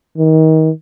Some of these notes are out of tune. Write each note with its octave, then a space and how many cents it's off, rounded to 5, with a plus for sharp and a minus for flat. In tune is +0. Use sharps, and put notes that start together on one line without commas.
D#3 +30